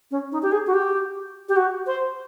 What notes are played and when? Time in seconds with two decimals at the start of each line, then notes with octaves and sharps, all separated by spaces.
0.11 C#4
0.32 D#4
0.42 G4
0.52 G#4
0.67 F#4
0.73 G4
1.49 G4
1.56 F#4
1.87 C5